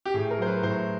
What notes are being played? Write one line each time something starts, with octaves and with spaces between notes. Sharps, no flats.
G4
A2 G#4
A#4
F#3 C5
B4
A2 C5